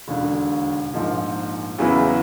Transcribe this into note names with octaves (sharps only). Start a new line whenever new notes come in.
E1 D#2 D3
A#1 G#2 F3 A#3 D#4
E2 C#3 F#3 B3 E4